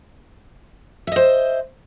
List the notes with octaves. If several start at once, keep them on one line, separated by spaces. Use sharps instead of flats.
C5 D#5 E5